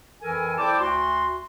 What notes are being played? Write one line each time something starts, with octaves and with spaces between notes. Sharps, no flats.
F2 E3 A4 A#4 G#5
E4 C5 D5 G5 A5 D6
D2 F#4 C6